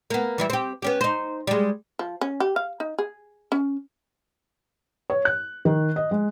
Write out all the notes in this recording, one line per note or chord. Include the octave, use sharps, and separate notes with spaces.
A#3 B3
E3 G3 E4
C4 G4
B3 C#4 G4
D#4 C5
G3 G#3
F3
C#4
G4
F5
D#4
G#4
C#4
C#5
F#6
D#3
D#5
G#3